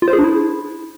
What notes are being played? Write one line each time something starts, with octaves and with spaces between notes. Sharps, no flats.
F4
C5
G#4
D4
E4